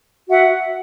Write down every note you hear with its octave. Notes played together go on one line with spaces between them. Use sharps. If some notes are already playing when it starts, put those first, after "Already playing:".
F#4 E5 F#5